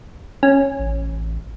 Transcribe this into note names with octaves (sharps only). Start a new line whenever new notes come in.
C#4
A1